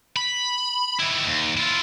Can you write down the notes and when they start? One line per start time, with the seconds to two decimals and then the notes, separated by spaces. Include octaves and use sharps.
0.17 B5
0.99 D#3 E4
1.26 D#2
1.57 E4 F4